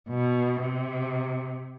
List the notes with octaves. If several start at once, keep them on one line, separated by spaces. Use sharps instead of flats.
B2
C3